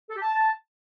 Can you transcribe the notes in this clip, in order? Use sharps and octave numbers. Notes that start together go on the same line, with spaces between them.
A4
G4
A5